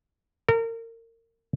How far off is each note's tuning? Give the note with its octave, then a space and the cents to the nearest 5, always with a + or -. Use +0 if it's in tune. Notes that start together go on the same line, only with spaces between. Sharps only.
A#4 -30